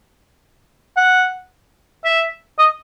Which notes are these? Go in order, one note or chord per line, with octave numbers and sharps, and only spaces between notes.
F#5
E5
D#5